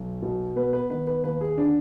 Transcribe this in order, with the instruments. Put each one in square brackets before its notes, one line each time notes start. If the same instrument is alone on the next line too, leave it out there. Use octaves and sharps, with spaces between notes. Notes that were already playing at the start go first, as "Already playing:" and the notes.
Already playing: [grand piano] B1
B2
B3 B4
B4
D#3 B4
B4
D#2 B4
G#4
D3 D4